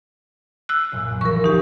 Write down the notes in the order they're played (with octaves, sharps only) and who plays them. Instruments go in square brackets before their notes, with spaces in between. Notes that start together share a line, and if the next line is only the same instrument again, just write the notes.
[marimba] E6 F#6
[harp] B1 F#2 A#2
G4
[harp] E3 F3 G3 [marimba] A#4 C#6
[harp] D2 D4 [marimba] D#4 G4